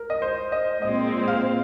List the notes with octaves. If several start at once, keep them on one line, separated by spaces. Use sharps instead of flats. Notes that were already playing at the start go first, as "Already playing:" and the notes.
Already playing: A#4
D#5
C5
D#5
A#2 G#3 C4 D#5
F5